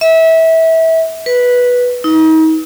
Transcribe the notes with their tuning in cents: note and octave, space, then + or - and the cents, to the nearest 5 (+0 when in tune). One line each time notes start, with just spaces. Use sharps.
E5 -25
B4 -10
D#4 +35